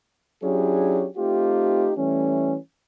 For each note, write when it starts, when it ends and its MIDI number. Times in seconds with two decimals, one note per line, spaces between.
0.43 1.06 54
0.43 1.06 61
0.43 1.06 62
0.43 1.06 64
0.43 1.06 67
0.43 1.06 68
1.17 1.91 57
1.17 1.91 60
1.17 1.91 63
1.17 1.91 65
1.17 1.91 67
1.97 2.56 52
1.97 2.56 55
1.97 2.56 57
1.97 2.56 61